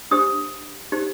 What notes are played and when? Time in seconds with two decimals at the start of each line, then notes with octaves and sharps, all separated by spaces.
0.11 D4 G4 C5 D#6
0.92 D#4 G4 C5